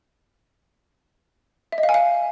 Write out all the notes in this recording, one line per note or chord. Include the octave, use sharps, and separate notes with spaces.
E5
D#5
F5
G#5
F5